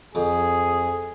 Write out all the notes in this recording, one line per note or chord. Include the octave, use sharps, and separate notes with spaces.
F2 G#4